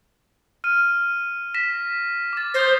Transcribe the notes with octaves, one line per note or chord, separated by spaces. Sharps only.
F6 D#7
A#6 B6 E7
D6 A6
C5 D#6 G6 A#6